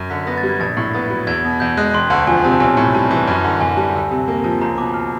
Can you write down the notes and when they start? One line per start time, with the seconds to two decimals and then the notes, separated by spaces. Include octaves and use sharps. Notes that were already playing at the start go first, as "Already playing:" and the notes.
Already playing: F#2
0.10 D3 B6
0.27 B3 A#6
0.38 A6
0.43 G3
0.49 G#6
0.60 A#1 A6
0.77 A2
0.94 B3 A6
1.10 F#3
1.27 E2 G#6
1.44 B2
1.60 E2 G6
1.77 G#3 F#6
1.94 E1 C6
2.10 D2 A5
2.27 F3 G#5
2.44 C3 A5
2.60 B1 G#5
2.77 A2
2.95 G3 A5
3.11 E3
3.28 F#2
3.44 D3
3.61 F#2 G#5
3.77 G3 A5
3.95 D2
4.11 C3
4.28 A#3
4.44 F3 A5
4.61 C#2 A#5
4.78 B2 D6
4.94 F6